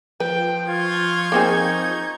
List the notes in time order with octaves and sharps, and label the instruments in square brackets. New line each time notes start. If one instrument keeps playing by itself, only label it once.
[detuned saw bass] F3 [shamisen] B4 [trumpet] G5
[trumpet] F4 [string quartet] C#6 G6 G#6
[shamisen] A#3 C4 G#4 [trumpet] D#4